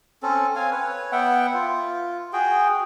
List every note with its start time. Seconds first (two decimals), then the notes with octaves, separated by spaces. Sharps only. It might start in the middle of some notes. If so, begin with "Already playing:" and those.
0.23 C4 C#4 A4
0.56 C4 F5 G#5
0.71 B4 C#5
1.12 B3 E5 F#5 G5
1.54 F4
2.33 F#4 G#4 G5